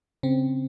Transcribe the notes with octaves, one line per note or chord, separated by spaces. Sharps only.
C#3 C4